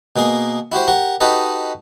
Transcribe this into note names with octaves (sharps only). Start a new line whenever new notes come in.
B2 A#3 G#4 A#4
E4 F#4 G4 C5
G4 A#4 F#5
D#4 F#4 G4 A4 B4 D#5